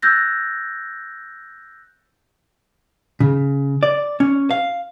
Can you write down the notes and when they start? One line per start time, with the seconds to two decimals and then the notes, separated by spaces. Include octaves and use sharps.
0.02 E6 F#6 G6 A6 A#6
3.20 C#3
3.83 D5
4.20 C#4
4.51 F5